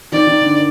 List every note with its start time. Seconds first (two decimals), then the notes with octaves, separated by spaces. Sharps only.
0.12 D#3 D5
0.27 D#3
0.41 D3